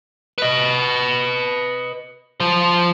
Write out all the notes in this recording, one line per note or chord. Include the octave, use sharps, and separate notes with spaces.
B4 D#5
F3 C5